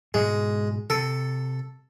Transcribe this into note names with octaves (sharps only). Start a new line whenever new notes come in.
G#2 B2 G#3
C3 A4